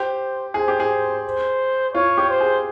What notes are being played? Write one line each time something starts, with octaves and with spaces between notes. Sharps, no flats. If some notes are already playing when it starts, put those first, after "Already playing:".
Already playing: G4 C5
G#4 C5
G4
G#4
C5
F4 C#5
G4
C5
G#4